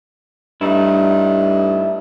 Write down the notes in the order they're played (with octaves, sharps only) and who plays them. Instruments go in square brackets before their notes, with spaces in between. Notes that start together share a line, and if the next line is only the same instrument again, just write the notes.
[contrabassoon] G2 [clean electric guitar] A3 D#4 E4